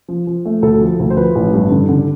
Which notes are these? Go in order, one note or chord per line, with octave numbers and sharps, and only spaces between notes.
F3
F3
A3
D2 A4
F3
D2
C5
F3 B4
A1
G2
D3
D3